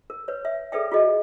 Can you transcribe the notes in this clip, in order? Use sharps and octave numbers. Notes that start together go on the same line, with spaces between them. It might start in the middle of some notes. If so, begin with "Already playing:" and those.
A#4
B4 C#5
E5
G#4 A4 B4 D5 E5 G5
F4 F#4 G#4 D#5